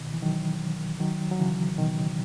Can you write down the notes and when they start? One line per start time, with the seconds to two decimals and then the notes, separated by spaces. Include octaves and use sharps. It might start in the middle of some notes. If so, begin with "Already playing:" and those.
Already playing: B2 D#3
0.14 E3
0.22 D#3 F#3
1.00 D#3 F#3
1.31 F#3
1.39 C#3 E3
1.78 B2 D#3